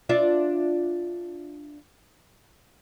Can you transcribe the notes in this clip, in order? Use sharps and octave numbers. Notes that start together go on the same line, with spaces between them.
D4 F4 E5